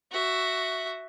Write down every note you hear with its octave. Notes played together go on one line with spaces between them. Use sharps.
F#4 E5